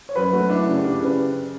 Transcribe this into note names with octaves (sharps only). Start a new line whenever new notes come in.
C#5
F#2 B4
A3 F#4
D4 E4
C#3 F#4
G4
D4
C#3 B4